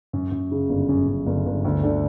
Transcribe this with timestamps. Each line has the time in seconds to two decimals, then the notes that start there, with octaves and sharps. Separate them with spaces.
0.13 F#2
0.31 F#2
0.51 C#3
0.69 G1
0.89 F#2
1.08 F#2
1.26 G1
1.46 G1
1.65 D2
1.83 D3